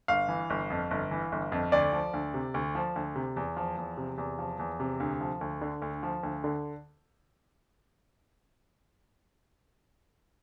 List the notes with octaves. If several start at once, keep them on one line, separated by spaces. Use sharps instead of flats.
G1 F5
E3
G1
F2
G1
E3
G1
F2
D2 D5
F3
D2
C3
D2
F3
D2
C3
E2
F3
E2
C3
E2
F3
E2
C3
D2
F3
D2
D3
D2
F3
D2
D3